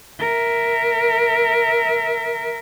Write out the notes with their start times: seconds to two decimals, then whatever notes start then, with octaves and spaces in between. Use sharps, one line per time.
0.20 A#4 E5